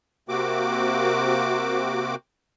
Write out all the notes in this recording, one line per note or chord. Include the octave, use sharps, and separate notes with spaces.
C3 A#3 C4 F#4 D6